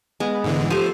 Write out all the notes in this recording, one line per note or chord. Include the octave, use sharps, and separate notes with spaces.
G#3 B3
G#2 D3 E3
F3 A3 G4 C5 D#7